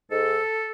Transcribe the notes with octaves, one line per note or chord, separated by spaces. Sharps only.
G#2 A4